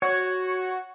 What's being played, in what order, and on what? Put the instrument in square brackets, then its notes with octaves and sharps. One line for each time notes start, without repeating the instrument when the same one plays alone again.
[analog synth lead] F#4 [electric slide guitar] C#5